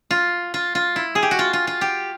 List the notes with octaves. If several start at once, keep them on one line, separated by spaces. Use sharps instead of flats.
F4
F4
F4
E4
G#4
G4
F#4
F4
F4
F4
G4